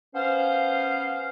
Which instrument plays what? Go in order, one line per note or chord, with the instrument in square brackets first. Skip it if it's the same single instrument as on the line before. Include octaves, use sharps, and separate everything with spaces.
[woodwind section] B3 C#4 C5 F5